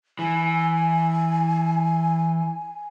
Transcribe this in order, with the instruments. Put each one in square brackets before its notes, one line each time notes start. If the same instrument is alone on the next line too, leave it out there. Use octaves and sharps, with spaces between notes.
[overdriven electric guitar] E3 [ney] G#5